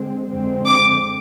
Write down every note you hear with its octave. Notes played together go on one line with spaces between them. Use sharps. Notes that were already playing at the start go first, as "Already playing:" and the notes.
Already playing: D3 G#3 C4
F2 D3 G#3 C4
D6